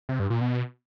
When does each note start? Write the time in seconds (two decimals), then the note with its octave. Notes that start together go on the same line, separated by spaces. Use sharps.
0.09 C3
0.20 G2
0.30 A#2
0.41 B2